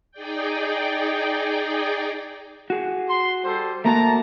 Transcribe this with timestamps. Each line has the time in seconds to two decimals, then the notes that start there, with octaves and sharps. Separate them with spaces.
0.12 D#4 G#4 D5 G5
2.70 F#4 G#4
3.09 C6
3.44 G3 A4 C5
3.85 A3 A#3 F#4 A5 A#5